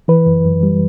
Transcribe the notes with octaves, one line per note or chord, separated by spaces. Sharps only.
E3 B4
F#2
F#2
G3